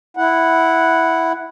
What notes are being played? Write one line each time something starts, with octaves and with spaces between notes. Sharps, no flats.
E4 F#5